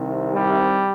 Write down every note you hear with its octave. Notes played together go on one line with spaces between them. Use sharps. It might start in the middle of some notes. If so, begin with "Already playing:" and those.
Already playing: C2 C3 D#3
G3